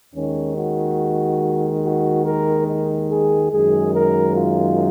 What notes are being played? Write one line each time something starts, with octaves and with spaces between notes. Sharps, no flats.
D#2 D#3 G#3 C#4
F#4
F#4
A#4
D#4
G#4
F#2 D#3 G#3 G#4
A#4
F4